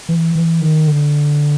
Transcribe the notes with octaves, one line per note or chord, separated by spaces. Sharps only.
E3
E3
D#3
D3